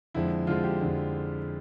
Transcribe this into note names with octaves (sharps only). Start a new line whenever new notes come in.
F2 D3 F3 G#3 E4
F2 D3 F3 G#3 F4
G4
F2 D3 F3 G#3